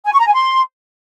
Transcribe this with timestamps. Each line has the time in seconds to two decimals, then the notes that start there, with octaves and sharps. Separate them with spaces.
0.05 G#5
0.13 C#6
0.20 A#5
0.27 G#5
0.34 C6